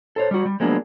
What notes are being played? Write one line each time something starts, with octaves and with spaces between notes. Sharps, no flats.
A4 C5 C#5
G3 F#4
G3
F3 F#3 G#3 A#3 B3 D4